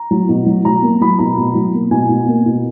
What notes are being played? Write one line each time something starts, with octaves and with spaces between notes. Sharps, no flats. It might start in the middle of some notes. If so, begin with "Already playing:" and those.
Already playing: A#5
F#3
B2
F#3
F#3 A#5
A#3
F#3 B5
B2 A#5
B2
F#3
A#3
B2 G#5
B2
A#3
B2